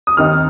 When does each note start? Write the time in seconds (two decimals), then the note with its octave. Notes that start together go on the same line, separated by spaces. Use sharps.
0.07 D#6
0.17 D#2 D#3 C4 D#4 F6